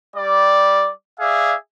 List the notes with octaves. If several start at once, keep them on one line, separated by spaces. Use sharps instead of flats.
G3 D5
G#4 D5 E5 F5